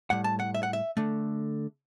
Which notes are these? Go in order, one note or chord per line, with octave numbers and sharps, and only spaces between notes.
A2 G3 F#5
A5
F#5
E5
F#5
E5
D3 A3